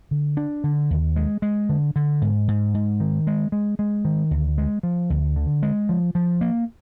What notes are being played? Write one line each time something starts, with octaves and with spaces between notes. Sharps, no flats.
D3
D4
D3
D#2
G#3
G#3
D3
D3
G#2
G#2
G#2
D#3
G#3
G#3
G#3
D#3
D2
G#3
F3
D2
D3
G#3
F3
F3
A#3